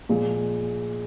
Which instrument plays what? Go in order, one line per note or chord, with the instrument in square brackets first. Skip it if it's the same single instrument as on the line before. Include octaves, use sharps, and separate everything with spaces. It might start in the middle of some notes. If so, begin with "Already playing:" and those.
[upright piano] A#2 F3 G#3